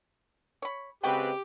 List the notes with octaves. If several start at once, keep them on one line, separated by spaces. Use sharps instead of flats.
C#5 B5
C#3 G#3 C4 F#4 G4 B4 G5